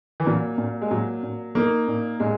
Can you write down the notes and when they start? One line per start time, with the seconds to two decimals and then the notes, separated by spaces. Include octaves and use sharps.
0.20 E3
0.26 A#2 F#3
0.58 A#2
0.82 G#3
0.91 A#2 F#3
1.23 A#2
1.55 A#3 D#4
1.88 A#2
2.20 A#2 G#3